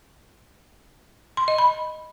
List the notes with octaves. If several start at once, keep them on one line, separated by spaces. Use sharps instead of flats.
C6
D#5
B5